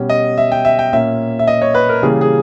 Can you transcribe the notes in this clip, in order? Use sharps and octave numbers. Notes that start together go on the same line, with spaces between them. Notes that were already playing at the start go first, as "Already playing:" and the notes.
Already playing: B2 G3 C#4
D#5
E5
G5
E5
G5
A#2 A#3 C#4 E5
E5
D#5
C#5
B4
A#4
C#3 E3 G3 A#3 C#4 G#4
G#4